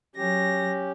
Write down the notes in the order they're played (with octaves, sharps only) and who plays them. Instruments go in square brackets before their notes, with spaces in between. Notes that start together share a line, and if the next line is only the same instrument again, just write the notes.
[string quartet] F#3 A#6 [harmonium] C#4 G4